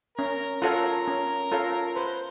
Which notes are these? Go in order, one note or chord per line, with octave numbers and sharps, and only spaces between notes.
C#4 A#4
F4 F#4 A4 A#4 C#5 F5
C#4
F4 A4 C#5 F5
B4 C5